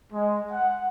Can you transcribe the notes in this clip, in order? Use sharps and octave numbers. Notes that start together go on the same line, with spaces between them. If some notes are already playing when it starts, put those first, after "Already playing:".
G#3
F#5